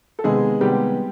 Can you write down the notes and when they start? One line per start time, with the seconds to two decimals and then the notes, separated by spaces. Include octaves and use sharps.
0.19 A4
0.24 C3 D#3 G#3 B3 G#4
0.60 C3 D#3 G3 G#3 B3 G4